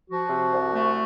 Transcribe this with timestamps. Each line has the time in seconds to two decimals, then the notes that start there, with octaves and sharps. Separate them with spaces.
0.09 F3 F#4
0.30 C3
0.51 C2
0.73 A3